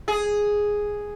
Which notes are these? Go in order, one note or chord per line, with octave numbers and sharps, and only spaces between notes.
G#4